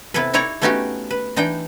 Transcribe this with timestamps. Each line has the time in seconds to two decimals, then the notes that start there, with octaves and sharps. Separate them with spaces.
0.14 C3 B3 E4 A4 B4
0.33 D#4 E4 C#5 D5 A#5
0.62 A3 B3 C#4 D#4 F#4 G4
1.11 B4
1.36 E3 D4 D#4 G5